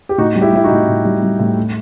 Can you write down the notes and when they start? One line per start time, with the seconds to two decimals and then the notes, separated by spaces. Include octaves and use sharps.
0.09 G4
0.18 A2 D#4 F#4
0.36 G3
0.41 E4 G4
0.53 G3 E4
0.64 D#4 F#4
0.71 A2
0.88 A2
1.05 G3
1.22 G3
1.39 A2
1.57 A3